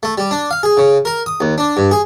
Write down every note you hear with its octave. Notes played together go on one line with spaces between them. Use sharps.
A3
G3
D4
F5
G#4
C#3
A#4
D#6
D#2
D4
G2
G#4